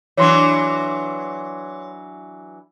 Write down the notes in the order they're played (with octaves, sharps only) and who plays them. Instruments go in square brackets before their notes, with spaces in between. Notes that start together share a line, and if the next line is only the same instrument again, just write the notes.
[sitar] E3 F#3 D4 [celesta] C#5 C6